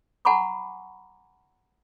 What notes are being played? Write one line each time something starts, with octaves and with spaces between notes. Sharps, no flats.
F#5 G#5 A#5 B5 C#6 D6